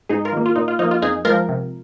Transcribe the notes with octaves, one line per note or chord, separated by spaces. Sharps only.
G#2 D#4 G#4
F4 A#4
D#3 A#3
F4
A#2 D#4
F4
F3 A#3 D#4
F4
F2 D#4 G#4
G#3 F4 A#4
F3
C3